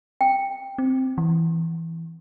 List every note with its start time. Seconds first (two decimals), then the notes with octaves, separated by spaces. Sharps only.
0.21 G5
0.78 C4
1.18 E3